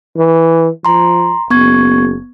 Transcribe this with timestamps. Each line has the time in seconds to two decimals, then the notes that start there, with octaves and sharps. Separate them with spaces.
0.16 E3
0.85 F3 A#5 C6
1.50 F#1 B3 C#6 G#6